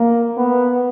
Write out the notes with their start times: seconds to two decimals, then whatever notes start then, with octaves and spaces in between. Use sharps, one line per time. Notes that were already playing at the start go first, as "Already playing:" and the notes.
Already playing: A#3
0.37 B3